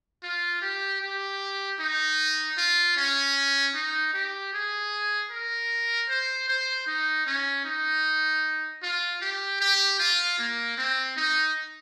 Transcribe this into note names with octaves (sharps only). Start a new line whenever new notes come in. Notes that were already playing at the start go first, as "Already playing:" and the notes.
F4
G4
G4
D#4
F4
C#4
D#4
G4
G#4
A#4
C5
C5
D#4
C#4
D#4
F4
G4
G4
F4
A#3
C4
D#4